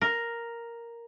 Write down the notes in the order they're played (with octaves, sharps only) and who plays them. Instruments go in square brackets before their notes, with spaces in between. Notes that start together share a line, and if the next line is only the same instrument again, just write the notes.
[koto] A#4